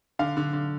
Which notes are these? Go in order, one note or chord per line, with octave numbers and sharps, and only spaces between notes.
D3 F5
D3
D3